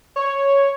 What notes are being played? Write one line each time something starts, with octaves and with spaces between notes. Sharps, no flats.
C#5